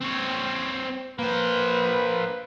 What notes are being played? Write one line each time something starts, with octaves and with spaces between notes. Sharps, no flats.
C4 C#5
A#3 B4 C5